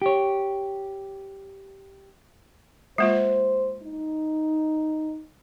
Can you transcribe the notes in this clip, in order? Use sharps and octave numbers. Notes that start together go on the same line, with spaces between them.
G4 C#5
G#3 A#3 F4 C5
D#4